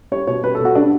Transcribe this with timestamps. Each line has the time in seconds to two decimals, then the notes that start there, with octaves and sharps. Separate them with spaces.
0.12 G3 C#5
0.27 B2 C#5
0.43 G3 B4
0.55 A4
0.60 B2
0.65 F#4
0.75 G3 D4